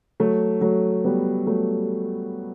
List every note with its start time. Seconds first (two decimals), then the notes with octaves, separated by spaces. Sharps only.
0.20 F#3 A3
0.61 F#3 A3
1.04 G3 B3
1.46 F#3 A3